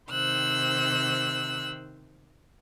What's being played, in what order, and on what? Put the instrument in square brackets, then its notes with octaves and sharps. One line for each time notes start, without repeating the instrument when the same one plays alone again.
[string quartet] C3 D#3 C5 E6 F#6